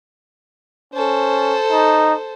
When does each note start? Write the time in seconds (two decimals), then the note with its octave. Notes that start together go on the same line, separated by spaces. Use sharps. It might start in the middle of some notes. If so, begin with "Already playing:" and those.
0.94 C#4 A4 C5
1.72 D#4